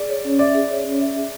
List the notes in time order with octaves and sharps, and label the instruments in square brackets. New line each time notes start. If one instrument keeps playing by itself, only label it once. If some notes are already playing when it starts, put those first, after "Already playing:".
Already playing: [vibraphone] G#4 [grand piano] D5
[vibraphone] C#5
C#4
[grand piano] D5 [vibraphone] E5
[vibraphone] G#4
C#5
C#4
E5
G#4